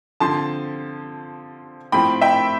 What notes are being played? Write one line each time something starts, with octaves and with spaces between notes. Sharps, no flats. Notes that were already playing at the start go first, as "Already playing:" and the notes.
D3 F3 C4 A5 C6
A2 F3 C4 G5 B5
E5 G5